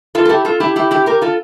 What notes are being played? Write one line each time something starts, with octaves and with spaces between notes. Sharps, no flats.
F4 A4
A4
E4 G4
F4 A4
E4 G4
E4 G4
E4 G4
G4 A#4
F4 A4